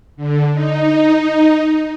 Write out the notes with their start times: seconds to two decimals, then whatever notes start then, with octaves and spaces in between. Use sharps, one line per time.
0.16 D3
0.52 D#4